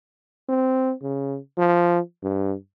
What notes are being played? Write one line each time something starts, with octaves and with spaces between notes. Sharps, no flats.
C4
C#3
F3
G2